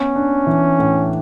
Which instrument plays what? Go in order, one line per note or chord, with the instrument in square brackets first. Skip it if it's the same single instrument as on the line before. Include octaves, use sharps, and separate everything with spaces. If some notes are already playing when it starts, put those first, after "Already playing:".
Already playing: [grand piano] B3 [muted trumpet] C#4
[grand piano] D4
E3
A2